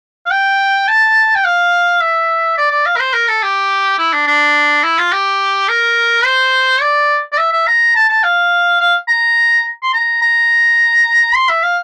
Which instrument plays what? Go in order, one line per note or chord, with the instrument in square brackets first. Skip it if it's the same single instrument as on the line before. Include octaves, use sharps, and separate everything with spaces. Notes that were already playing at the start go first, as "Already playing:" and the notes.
[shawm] F5
G5
A5
G5
F5
E5
D5
D5
F5
A#4
C5
A#4
A4
G4
E4
D4
D4
E4
F4
G4
A#4
C5
D5
D5
E5
E5
A#5
A5
A5
F5
F5
A#5
C6
A#5
A#5
C6
E5
F5